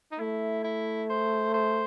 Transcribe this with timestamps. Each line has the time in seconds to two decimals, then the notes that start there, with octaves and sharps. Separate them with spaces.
0.12 D#4
0.20 A3 E4
0.64 E4
1.09 C5
1.54 C5